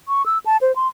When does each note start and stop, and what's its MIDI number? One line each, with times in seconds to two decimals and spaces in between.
0.08 0.25 85
0.26 0.39 88
0.46 0.57 81
0.61 0.75 72
0.76 0.88 84